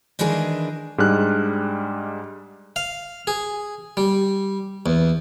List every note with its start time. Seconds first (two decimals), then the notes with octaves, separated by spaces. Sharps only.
0.19 D#3 E3 G#3 D4 G#4 A#4
0.98 G#2 G3 G#3 D4 F6 F#6
2.76 F5
3.27 G#4
3.97 G3
4.86 E2